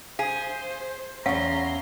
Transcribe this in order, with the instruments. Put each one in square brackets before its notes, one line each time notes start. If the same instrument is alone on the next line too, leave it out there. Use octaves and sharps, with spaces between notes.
[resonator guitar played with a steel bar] G#4 [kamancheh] C5 [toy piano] F5
[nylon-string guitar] E2 C#4 [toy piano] F5 F#5 [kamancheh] A#5 C6